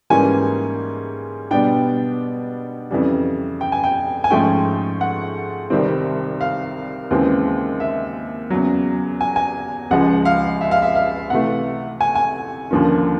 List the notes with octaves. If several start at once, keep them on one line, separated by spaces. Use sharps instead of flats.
G#2 E3 G3 A#3 C#4 G#5
B2 G3 B3 D4 G5
F2 C#3 E3 G3
G5
G#5
G5
G#5
G#2 F3 A3 C#4 G5
F#5
C2 C3 D#3 G3 C4
F5
D#2 C#3 E3 G#3 C4
E5
E2 C#3 F#3
G#5
G#5
C#2 C#3 F3 G#3 F#5
F5
E5
F5
E5
F5
C3 E3 A3 F#5
G#5
G#5
D#2 D3 F3 A#3 C#4